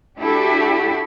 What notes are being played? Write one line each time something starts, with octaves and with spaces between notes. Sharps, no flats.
D4 E4 F#4 G4 A4